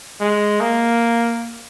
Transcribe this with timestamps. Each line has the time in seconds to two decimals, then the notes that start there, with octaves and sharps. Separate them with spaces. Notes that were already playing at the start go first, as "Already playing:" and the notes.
0.20 G#3
0.60 A#3